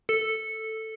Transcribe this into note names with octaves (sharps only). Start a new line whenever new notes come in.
A4